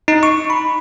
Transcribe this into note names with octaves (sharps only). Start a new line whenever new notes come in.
D#4
C#6
B5